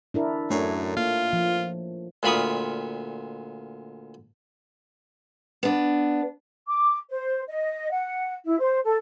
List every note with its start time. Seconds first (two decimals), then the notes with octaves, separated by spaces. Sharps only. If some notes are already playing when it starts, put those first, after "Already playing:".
0.14 D4 E4 A#4
0.50 F#2 A3 D4 C#5
0.97 A#3 F4
1.33 F3
2.23 D2 A#2 F4 B5 C#6 D#6
5.63 B3 D4
6.68 D6
7.09 C5
7.48 D#5
7.90 F#5
8.45 E4
8.59 C5
8.84 A4